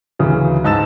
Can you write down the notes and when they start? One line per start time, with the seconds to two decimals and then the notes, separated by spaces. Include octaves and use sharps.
0.19 D2 C#3 E3 F#3
0.64 G#2 D#4 A5 E6 A6 E7